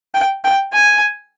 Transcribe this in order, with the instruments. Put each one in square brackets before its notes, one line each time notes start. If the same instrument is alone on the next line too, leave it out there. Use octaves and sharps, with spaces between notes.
[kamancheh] G5
G5
G#5